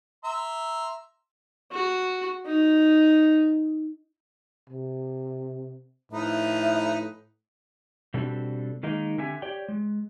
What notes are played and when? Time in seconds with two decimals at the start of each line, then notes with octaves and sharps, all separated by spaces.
0.24 E5 A#5 C6
1.72 F#4
2.46 D#4
4.70 C3
6.12 A2 F3 D#4 B4 E5
8.14 B2 G3 C4 D4 A4
8.83 D#3 G#3 A#3 D#4
9.18 D3 C4 G4 E5 G#5
9.42 G4 C#5 D5 G5
9.69 G#3